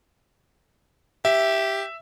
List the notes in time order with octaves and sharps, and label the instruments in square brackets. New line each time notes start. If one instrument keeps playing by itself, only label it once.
[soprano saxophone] G4 [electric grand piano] E5